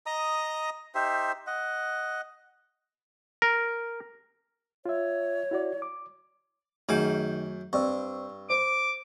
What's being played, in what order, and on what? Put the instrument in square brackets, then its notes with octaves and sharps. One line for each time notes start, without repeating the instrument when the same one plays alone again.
[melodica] D#5 A#5 D#6
D#4 G4 C5 E5
D#5 F#5
[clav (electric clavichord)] A#4
[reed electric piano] F4 E5 [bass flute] C#5
[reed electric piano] E4 F#4 D5
D6
[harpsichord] F#2 G#5 D6 [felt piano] D#3 [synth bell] A3 G#4 G6
[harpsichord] G2 [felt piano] C4 D5 [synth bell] C#6 E6
[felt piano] C5 [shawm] D6